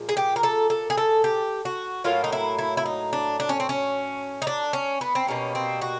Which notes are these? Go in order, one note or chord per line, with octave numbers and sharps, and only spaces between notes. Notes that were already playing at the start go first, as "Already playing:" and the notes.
Already playing: A#2 F3 G#3
G#4
G4
A#4
A4
A4
G#4
A4
G4
F#4
A2 F#3 A#3 F4
D#4
E4
E4
E4
D#4
D4
D4
C#4
C4
C#4
D#4
D4
C#4
B3
C4
B2 G3 A#3 C#4
C4
F#4